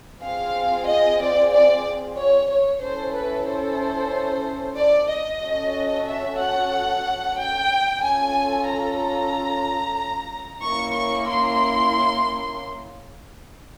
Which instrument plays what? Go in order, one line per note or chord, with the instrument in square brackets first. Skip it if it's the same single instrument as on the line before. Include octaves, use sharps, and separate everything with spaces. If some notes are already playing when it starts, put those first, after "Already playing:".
[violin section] C4 F4 G#4 F5
D#5
D5
D5
C#5
C#5
C#4 E4 A4 C5
B4
C5
D5
D#5
C#4 F#4 A4
E5
F#5
G5
C#4 F4 A4 G#5
A#5
A#3 C#4 E4 C#6
C#6
C6